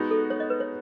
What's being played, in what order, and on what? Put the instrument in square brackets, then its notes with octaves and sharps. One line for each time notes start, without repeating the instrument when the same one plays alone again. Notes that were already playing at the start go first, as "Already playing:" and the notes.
Already playing: [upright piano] G#3 B3 D#4 F#4
[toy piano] A4
C#5
D#5
B4
C#5